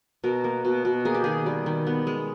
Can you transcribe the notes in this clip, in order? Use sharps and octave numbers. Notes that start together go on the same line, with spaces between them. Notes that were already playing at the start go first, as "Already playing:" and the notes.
B2 A#4
A#3
B2
B2
A#3 G#4
G4
D#3 G#4
G3
D#3
B3
G#3